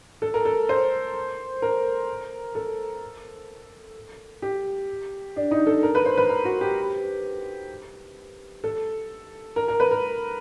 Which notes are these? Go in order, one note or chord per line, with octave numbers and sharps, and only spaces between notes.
A4
A#4
A4
C5
A#4
A4
G4
D4
D#4
A4
A#4
B4
C5
B4
A#4
F#4
G4
A4
A#4
A#4
B4
A#4